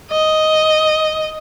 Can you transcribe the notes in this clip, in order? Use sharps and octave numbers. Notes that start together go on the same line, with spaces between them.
D#5